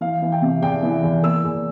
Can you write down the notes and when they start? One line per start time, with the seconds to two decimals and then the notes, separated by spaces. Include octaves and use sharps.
0.01 E3 F5
0.22 E3
0.32 G5
0.42 C3
0.62 E2 G5
0.83 E3
1.04 E2
1.23 A#3 E6
1.44 E2